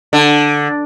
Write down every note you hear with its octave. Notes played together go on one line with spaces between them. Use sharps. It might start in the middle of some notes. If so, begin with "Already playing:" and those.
D3